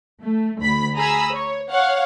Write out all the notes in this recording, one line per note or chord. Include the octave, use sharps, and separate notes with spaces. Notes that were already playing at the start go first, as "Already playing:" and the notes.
A3
D2 B5 B6
G#4 A#5 B5 D#6 E6
C#5
C#5 F5 F#5